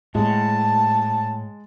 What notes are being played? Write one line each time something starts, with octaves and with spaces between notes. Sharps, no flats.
A2 G#3 A5